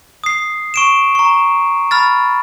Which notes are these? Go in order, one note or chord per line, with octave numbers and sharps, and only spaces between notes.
D#6 C7
C#6 D7 E7
A#5 C#6
B5 F6 A6